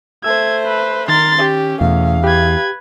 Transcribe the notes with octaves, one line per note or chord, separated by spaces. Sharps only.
A3 C5 E6 G#6
B4
D#3 A#4 C6 A6
C#4 G4
E2 B2 A3 F5
G4 B4 G#6